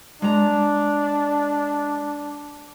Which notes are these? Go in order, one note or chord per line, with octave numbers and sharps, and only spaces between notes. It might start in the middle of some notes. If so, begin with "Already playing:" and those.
G#3 D4 A#5